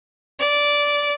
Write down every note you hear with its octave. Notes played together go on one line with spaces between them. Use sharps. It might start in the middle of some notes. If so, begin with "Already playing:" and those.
D5